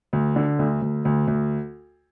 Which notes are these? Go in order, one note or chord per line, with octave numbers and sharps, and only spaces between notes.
D2
D3
D2
D2
D2
D2